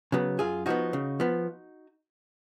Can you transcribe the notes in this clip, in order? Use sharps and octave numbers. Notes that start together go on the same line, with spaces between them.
C#3 F#3 B3
F#2 F4 G#4
F3 G#3 B3 D#4 F#4
C#3
F3 B3